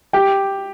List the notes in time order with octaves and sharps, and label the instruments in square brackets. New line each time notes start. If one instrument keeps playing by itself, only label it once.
[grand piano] G4 G5